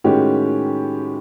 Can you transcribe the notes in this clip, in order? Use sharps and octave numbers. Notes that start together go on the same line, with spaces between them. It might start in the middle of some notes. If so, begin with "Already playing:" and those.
A2 D#3 G#3 C#4 F#4 G4